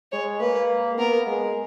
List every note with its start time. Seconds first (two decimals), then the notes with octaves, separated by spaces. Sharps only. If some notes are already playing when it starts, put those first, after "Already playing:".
0.12 G#3 C#5
0.40 A#3 B4
0.98 B3 A#4
1.27 G#3